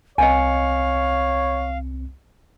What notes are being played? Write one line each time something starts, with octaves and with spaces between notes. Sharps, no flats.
C2 C4 C#5 D#5 F5 G#5 C#7